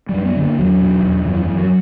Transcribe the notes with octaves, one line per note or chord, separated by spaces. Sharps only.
G3
F#2
B3
D3
A#3
E2 F#3
B2
E2
F#2 E3
F#2
F#3